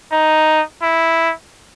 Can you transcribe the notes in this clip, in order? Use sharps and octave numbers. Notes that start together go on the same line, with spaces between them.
D#4
E4